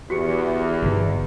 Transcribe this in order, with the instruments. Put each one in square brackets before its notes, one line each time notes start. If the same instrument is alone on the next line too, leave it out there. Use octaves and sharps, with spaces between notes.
[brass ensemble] E2 [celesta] F#4 G4 C#7
[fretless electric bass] G1 D3 D#3